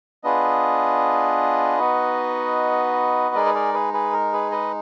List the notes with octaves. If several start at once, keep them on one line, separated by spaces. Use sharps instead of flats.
B3 D4 F4 G#4 B4 D#5
B3 D#4 F#4
G#3 D#4 G#4 A#4 D5
B4
A#4 D5
G#4 B4
G#4 B4
A#4
G#4 B4
B4 D#5